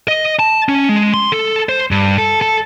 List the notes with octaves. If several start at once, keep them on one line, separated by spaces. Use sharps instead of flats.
D#5
A5
C#4
G#3
C6
A4
C5
G2
A4
A4